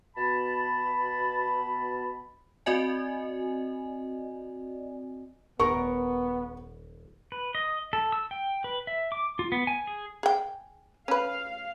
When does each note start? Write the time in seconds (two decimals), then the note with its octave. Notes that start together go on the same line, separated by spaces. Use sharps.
0.17 B2 A5 B5
2.66 C4 F#4 D5 D#5 G#5
5.60 D#1 B3 A#4 C#6
7.32 B4
7.55 D#5
7.93 A4
8.12 E6
8.31 G5
8.64 B4
8.87 E5
9.12 D6
9.39 F4
9.52 B3
9.67 G#5
9.87 G#4
10.23 G#4 G5
11.08 C#4 B4 F5